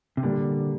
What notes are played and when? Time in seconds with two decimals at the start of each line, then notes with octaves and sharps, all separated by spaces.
0.17 C3
0.23 A#2 D3 G3 A#3